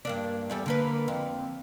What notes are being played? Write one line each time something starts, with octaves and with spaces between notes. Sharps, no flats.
G2 A#3 D4
E2 G3 A4
D3 A#3 B4
F2